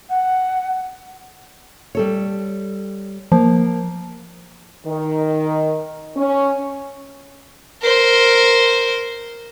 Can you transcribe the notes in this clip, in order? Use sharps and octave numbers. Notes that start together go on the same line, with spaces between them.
F#5
G3 A4 C#5
F3 A#3
D#3
C#4
A#4 C5